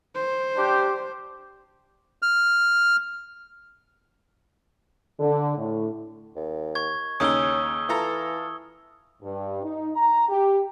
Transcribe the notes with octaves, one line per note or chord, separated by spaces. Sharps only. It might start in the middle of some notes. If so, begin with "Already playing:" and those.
C5
D4 G4
F6
D3
A2
D#2
C#6 G#6
D#2 C#3 C#4 D#4 D#6 E6 G7
E3 F4 A4 A#5
G2
D#4
A#5
G4